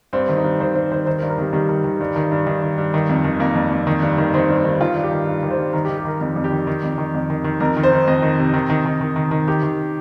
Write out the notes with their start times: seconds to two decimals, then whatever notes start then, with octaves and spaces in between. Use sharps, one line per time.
0.13 G2 C4
0.29 D#3
0.37 D#4
0.44 G2
0.60 D#3 C5
0.75 G2 C5
0.92 D#3 C5
1.06 D#3 C5
1.19 A#4
1.22 G2
1.30 A#4
1.38 D#3 G3
1.53 D#3 G3
1.69 D#3
1.84 D#3
2.00 G2
2.16 D#3
2.32 G2
2.47 D#3
2.62 D#3
2.78 G2
2.94 D#3
3.09 F2
3.24 D#3
3.40 F2 A#3
3.55 F2
3.72 F2
3.87 D#3
4.02 G2
4.18 D#3
4.34 D#3 C4
4.49 G2
4.65 D#3
4.80 D#3 F4
4.95 G2
5.04 G4
5.11 D#3
5.27 G2
5.43 D#3
5.51 C5
5.58 G2
5.73 D#3 A#4
5.85 G4
5.89 D#3
5.97 G4
6.05 D#3 A#4
6.21 F2
6.36 F2
6.44 G4
6.52 D#3
6.67 D#3
6.83 F2
6.98 D#3
7.14 F2
7.30 D#3
7.44 D#3
7.60 F2 A#4
7.77 D#3
7.83 C5
7.92 D#3
8.08 F2 D#5
8.22 D#3
8.38 C3
8.54 D#3
8.70 D#3
8.86 D#3
9.01 D#3
9.16 D#3
9.31 D#3
9.48 D#3 G4
9.63 D#3